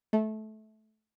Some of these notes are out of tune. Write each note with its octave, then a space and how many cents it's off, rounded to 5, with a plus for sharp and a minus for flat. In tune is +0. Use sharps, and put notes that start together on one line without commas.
A3 -20